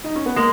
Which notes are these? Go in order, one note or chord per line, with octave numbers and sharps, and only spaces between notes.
D#4
C#4
B3
G#3 A#3